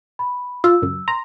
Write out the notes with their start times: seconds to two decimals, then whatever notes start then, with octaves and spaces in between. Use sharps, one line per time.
0.19 B5
0.64 F4 E6
0.82 C#2 F#2
1.08 A#5 C6